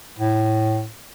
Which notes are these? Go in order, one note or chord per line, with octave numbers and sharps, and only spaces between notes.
A2